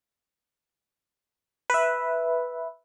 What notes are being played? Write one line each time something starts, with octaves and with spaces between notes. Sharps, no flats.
B4 E5